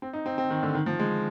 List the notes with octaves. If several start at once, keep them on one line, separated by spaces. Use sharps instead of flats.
C4
D#4
C4
C4
D#3
D3
D#3
F3
G#3